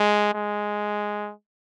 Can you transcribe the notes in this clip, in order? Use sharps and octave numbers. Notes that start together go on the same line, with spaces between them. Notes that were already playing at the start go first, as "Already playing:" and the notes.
Already playing: G#3
G#3